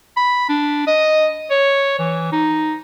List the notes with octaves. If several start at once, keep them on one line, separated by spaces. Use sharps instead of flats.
B5
D4
D#5
C#5
E3
D#4